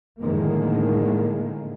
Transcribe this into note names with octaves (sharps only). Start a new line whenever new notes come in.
A2 D3 D#3 F3 G#3 A#3